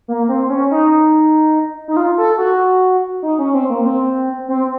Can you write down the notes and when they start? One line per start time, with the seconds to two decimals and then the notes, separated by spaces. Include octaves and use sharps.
0.08 A#3
0.29 C4
0.49 C#4
0.71 D#4
1.88 D#4
1.97 F4
2.18 A4
2.38 F#4
3.23 D#4
3.38 C#4
3.54 C4
3.70 A#3
3.85 C4
4.48 C4